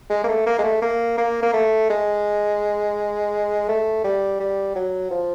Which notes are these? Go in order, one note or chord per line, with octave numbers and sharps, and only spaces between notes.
G#3
A#3
A3
A#3
G#3
A3
A#3
A#3
A#3
A3
G#3
A3
G3
G3
F#3
F3